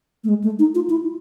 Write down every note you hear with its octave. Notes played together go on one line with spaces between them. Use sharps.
A3
G#3
A3
D#4
F4
E4